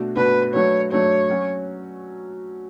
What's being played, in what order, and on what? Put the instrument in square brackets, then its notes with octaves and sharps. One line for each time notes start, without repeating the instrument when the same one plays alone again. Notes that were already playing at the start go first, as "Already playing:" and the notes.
Already playing: [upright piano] B2 A3 D4 F#4
[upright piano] B2 A3 D4 F#4 [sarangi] B4
[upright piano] F#3 A3 D4 F#4 [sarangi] C#5
[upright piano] F#3 A3 D4 F#4 [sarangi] C#5
[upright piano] F#3 C#4 F#4